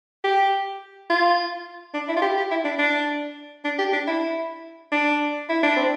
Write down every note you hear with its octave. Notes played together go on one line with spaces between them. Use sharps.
G4
F4
D4
E4
F4
G4
G4
E4
D4
D4
D4
G4
D4
E4
D4
E4
D4
C4